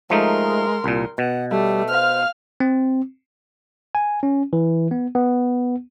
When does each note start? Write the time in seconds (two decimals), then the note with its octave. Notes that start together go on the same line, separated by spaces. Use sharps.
0.10 F3 G#3 A3 D#4 A#4 C6
0.84 C2 A#2
1.18 B2 F#5
1.51 G3 A3
1.88 C5 F5 F6
2.60 C4
3.95 G#5
4.23 C#4
4.53 E3
4.91 B3
5.15 B3